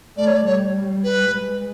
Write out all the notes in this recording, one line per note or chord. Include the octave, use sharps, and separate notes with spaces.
A3 D5
C#5
D5
G3 C#5
B4
G#3